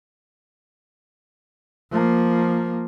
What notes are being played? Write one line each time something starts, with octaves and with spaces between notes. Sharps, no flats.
F3 A#3